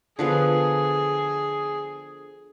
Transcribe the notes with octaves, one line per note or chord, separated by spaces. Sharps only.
D3 F3 B3 G#4